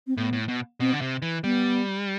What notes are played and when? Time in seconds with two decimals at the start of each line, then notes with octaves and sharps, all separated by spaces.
0.07 C4
0.17 A2 B3
0.33 A2
0.48 B2
0.80 B2 C4
0.93 D3
1.01 C3
1.22 E3
1.44 G3 B3